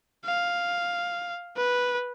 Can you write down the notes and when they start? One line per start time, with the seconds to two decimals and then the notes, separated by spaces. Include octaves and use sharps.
0.25 F5
1.57 B4